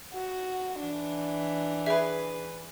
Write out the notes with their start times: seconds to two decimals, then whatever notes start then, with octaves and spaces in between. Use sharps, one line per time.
0.13 F#4
0.80 E3 D4
1.86 G#4 B4 E5